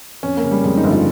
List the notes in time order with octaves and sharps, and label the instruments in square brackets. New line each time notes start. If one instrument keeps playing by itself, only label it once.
[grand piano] F2 [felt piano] C#4
[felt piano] A#3
[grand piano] C#3
[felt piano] G3
[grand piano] F2 [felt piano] G#3
[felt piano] D#4
[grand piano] G1
[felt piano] F4